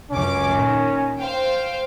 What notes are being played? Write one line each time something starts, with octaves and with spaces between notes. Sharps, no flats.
C#2 F#2 C#4 D6
A#2 D#3
C5 F5 G5